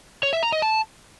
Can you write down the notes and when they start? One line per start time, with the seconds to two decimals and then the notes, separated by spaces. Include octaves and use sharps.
0.23 C#5
0.33 E5
0.43 A#5
0.52 D#5
0.62 A5